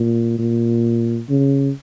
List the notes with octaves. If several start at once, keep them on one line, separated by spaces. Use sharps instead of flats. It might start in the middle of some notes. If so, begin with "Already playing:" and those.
Already playing: A#2
A#2
C#3